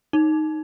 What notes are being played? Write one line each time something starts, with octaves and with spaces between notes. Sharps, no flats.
D#4